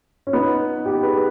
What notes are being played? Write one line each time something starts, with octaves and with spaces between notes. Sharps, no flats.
C#4
B3 D#4
D#4 G4
G#4 B4